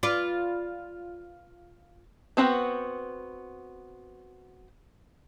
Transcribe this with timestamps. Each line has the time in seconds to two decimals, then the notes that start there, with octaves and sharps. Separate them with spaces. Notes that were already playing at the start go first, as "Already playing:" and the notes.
0.03 F4 B4 D5
2.37 B3 C4 D4 F#4 B4